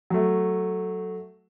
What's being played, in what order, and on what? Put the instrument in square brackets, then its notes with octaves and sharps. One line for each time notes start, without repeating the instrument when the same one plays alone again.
[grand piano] F#3 A3